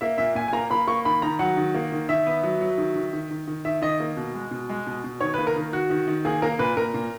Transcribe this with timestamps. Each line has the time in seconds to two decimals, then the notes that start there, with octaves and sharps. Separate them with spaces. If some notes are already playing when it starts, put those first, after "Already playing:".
0.01 A#3 E5
0.18 A#2 E5
0.35 A#2 G#5
0.48 G#5
0.53 A#3 A#5
0.70 A#3 B5
0.88 A#3 C#6
1.05 D#3 B5
1.22 D#3 A#5
1.39 F#3 F#5
1.57 D#3
1.75 A#3
1.92 D#3
2.09 D#3 E5
2.27 B3
2.43 F#3
2.61 F#3
2.78 D#3
2.95 D#3
3.13 D#3
3.31 D#3
3.47 D#3
3.65 D#3 E5
3.82 D#3 D#5
4.00 A#3
4.17 B2
4.35 G#3
4.51 B2
4.69 G#3
4.87 B2
5.04 B2
5.21 D#3 C#5
5.34 B4
5.38 A#3
5.47 A#4
5.56 D#3
5.73 D#3 F#4
5.90 D#3
6.08 D#3
6.25 A#3 G#4
6.42 A#3 A#4
6.59 A#2 B4
6.77 A#2 A#4
6.94 A#2